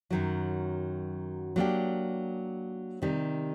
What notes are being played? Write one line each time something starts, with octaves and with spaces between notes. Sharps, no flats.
F#2 D#3 F#3
F#3 A#3 D4 G4
C3 D#3 G3